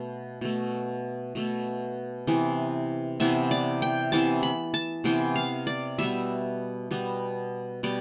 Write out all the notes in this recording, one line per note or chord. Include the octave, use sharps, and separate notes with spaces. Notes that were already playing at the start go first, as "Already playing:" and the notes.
Already playing: B2 A3
B2 A3
B2 A3
C3 E3 B3
C3 E3 B3 E5
D5
G5
C3 E3 B3 A5
B5
A5
C3 E3 B3 G5
F5
D5
B2 G3 B3 E5
B2 G3 B3
B2 G3 B3 D5